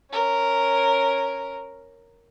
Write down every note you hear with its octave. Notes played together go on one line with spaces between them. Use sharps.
C#4 A#4